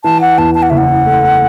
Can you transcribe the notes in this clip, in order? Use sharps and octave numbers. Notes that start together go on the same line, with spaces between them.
E3 A5
F#5
E2 A5
A5
F#5
F#1 E5
F#5
A3